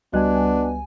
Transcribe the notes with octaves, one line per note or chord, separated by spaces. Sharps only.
C#2 G3 B3 D4 F#4 D#5 G#5 F#6